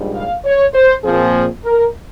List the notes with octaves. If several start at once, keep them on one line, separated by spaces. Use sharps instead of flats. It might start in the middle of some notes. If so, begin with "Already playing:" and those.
Already playing: A#1 G#2 G3
F5
C#5
C5
A#2 F3 C4 G#4
A#4